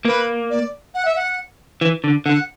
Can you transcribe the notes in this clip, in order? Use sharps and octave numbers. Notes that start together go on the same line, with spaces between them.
A#3 B4
D5
F#5
E5
F#5
E3
D3
D3 F#5